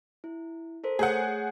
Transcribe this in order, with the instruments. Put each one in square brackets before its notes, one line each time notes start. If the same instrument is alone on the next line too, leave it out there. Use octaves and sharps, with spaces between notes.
[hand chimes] E4
A4 A#4 C5
[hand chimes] A3 C#5 G6 [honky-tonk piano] G#4 F#5